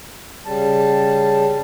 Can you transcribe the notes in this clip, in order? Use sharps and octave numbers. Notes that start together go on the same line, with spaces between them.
C#3 G3 A5